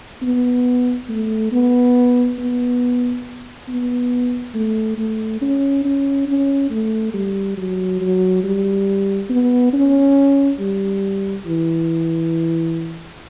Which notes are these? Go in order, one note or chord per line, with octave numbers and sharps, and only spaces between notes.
B3
A3
B3
B3
B3
A3
A3
C#4
C#4
C#4
A3
G3
F#3
F#3
G3
B3
C#4
G3
E3